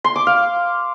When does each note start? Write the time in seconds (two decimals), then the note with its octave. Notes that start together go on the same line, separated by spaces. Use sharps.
0.04 C6
0.16 D6
0.27 F5